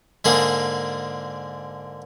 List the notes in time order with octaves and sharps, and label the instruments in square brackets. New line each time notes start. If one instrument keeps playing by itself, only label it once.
[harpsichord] G#2 D3 A#3 D4 G#4